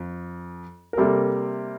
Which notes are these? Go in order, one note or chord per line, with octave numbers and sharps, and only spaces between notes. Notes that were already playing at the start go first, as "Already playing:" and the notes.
Already playing: F2
A#4
C3 G3 A#3 A4